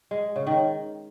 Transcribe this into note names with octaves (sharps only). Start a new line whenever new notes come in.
G#3
C#3
D#3